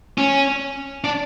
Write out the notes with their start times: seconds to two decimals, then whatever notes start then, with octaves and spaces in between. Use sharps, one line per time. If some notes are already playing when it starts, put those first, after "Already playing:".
0.18 C#4
1.04 D4